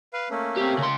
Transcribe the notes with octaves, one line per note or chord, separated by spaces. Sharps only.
B4 F5
A3 A#3 C#4
C4 G4
C#3 C6